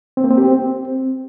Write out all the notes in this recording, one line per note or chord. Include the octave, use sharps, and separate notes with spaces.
C4
A#3
C4
G4
C4